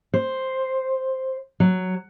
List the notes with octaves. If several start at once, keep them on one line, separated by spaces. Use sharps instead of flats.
C5
F#3